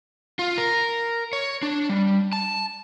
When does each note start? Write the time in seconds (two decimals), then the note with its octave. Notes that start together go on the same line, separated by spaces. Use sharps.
0.39 F4
0.58 A#4
1.33 C#5
1.63 D4
1.89 G3
2.33 A5